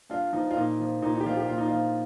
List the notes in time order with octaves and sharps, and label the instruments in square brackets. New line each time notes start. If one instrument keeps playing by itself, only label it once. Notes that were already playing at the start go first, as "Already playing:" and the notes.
[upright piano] G2 F4
F3 D#4
F4
A#2 D#4
F3
A#2 D#4
D#4
G4
F3 F4
G4
A#2 F4
D#4
F3 F4